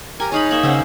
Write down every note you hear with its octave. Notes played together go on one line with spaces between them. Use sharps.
G4 A#4 G#5 A#5
D#4 G#4 C#5 F5 B5
A#3 C#5 E5 B5
C#3 C#4 C5 F#5 E6